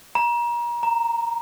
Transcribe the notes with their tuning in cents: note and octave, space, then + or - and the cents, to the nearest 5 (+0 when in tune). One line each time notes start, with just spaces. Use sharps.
A#5 +35
A#5 -10